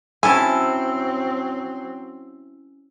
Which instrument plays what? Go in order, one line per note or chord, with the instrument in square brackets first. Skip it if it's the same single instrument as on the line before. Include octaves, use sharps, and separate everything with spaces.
[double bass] F#3 C4 [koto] C#4 E4 A5 [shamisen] G#5 [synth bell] E6